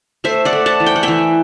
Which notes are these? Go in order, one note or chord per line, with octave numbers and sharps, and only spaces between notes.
A3 C5 E5
D5 F#5
A3
F#5 A5
E3
G5
F#5
E3 E5 G5